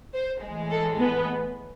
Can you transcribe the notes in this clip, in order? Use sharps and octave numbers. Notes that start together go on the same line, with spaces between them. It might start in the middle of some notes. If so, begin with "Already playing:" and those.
C5
A2 E3 G#3
A4
B3